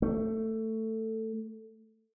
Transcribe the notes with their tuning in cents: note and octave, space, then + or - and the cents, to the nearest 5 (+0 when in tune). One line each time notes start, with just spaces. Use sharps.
A3 +15